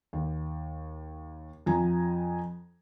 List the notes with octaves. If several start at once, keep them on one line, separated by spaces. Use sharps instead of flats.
D#2
F2 F3 G#5 A#5